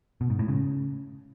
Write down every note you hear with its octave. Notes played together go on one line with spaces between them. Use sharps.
B2
G#2
A2
C#3